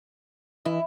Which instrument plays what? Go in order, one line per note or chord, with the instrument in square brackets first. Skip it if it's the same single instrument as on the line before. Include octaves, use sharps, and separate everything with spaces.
[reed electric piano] E3 D#5 [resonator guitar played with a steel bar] E4